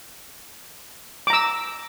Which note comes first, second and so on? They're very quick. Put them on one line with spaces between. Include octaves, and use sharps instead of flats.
D6 A#5 E6